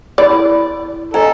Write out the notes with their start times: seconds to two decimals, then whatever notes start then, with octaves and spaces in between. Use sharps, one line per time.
0.18 E4 D5 B5
1.14 A4 D#5 G#5 A#5